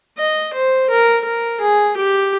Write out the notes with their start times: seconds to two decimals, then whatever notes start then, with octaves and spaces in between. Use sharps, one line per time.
0.18 D#5
0.54 C5
0.90 A#4
1.25 A#4
1.61 G#4
1.97 G4